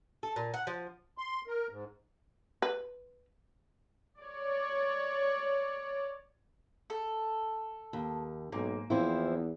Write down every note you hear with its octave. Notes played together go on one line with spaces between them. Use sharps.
A4
A#2
F#5
F3
C6
A#4
G#2
B4
C#5 D5
A4
D#2
B1 G#2 A#3
E2 F3 C4 E4